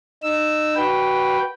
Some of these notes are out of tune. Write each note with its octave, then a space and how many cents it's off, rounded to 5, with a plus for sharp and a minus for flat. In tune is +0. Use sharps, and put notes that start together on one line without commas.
D#4 -30 E6 +0
F#4 +20 B4 -5 G5 +0